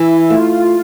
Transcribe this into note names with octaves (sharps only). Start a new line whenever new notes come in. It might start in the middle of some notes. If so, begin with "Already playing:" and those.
Already playing: E3 E4
A3 F4